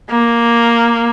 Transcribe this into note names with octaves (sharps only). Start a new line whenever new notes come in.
A#3